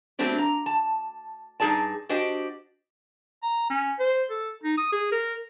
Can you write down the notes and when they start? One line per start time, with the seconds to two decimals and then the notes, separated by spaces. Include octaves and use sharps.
0.19 F#3 A3 B3 C4 D4 G4
0.38 A#5
0.66 A5
1.60 G2 D#4 G#4 D5 A5
2.09 D4 F#4 G4 C5 D#5
3.43 A#5
3.70 C#4
3.99 C5
4.30 A4
4.63 D#4
4.77 D#6
4.92 G#4
5.12 A#4